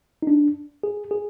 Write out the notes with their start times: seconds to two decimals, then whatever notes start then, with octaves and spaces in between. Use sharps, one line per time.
0.22 D#4
0.27 D4
0.83 G#4
1.11 G#4